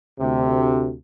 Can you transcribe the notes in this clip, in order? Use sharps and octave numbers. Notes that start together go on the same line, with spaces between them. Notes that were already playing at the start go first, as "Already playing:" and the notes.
D2 C3